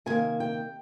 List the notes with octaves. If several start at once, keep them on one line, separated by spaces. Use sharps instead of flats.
F2 C3 D#3 A#3 G#5
G5